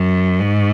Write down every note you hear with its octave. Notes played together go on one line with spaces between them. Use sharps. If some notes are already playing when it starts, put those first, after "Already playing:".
Already playing: F#2
G#2